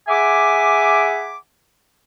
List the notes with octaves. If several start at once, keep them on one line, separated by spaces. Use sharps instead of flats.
G#4 E5 F#5 G#5 B5 D6